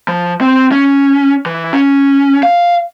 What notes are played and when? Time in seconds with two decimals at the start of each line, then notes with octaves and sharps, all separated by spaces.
0.08 F3
0.41 C4
0.72 C#4
1.46 E3
1.73 C#4
2.43 F5